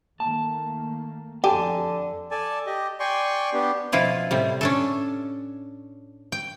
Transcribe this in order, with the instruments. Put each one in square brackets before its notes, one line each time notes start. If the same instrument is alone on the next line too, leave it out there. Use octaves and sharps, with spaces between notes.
[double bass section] D#3 A3 A#3 [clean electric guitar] A5
[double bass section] F2 [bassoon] D3 [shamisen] G4 [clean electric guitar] G#5 A5
[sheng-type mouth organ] A4 D5 G#5 A5
G4 D#5
D5 G5 G#5 C6 C#6
B3 D4 G4
[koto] B2 F3 E4 F4 B4
A2 C3 G3
C#4 D4 A4
G5